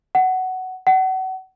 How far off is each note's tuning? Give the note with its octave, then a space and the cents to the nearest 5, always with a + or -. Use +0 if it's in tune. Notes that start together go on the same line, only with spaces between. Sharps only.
F#5 +10
F#5 +30